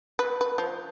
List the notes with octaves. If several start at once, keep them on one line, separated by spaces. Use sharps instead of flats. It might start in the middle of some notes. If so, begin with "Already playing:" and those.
B4
B4
F3